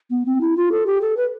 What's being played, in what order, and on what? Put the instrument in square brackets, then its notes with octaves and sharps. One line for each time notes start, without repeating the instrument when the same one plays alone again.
[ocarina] B3
C4
E4
F4
A4
G4
A4
B4